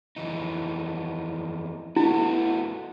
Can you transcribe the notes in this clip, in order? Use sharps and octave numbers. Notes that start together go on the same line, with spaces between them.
F2 E3 D#4
A3 B3 E4 F#4